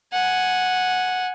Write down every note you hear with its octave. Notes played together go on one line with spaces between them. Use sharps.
F#5 G#5